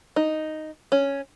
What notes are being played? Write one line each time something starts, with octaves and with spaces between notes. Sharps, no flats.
D#4
C#4